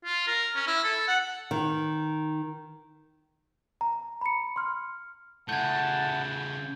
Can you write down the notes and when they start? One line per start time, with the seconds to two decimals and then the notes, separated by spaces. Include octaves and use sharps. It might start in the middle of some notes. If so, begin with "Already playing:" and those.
0.05 F4
0.27 A#4
0.55 C#4
0.67 E4
0.84 A4
1.08 F#5
1.51 D#3
3.81 A#5
4.21 B5 C#7
4.56 C6 F6
5.49 C#3 A3 E4 F#5 A5 G6 G#6